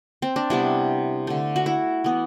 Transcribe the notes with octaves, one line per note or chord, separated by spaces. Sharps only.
C4
D4
C3 G3 B3 E4
D3 A3
F#4
E4
E3 B3